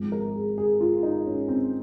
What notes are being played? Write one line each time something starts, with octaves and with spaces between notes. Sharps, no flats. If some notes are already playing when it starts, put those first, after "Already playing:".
Already playing: G#1 G#2 F3
A#4
G#4
G#4
F4
D#4
C#4
C4